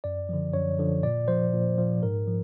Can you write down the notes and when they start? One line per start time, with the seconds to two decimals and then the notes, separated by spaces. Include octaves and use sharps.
0.04 F#2 D5
0.29 D3 F3
0.53 F#2 C#5
0.79 D3 F3
1.03 A#2 D5
1.28 F3 C5
1.54 A#2
1.78 F3
2.03 G#2 A#4
2.27 F3